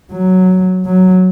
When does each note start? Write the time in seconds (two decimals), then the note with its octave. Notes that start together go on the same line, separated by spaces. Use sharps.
0.12 F#3
0.86 F#3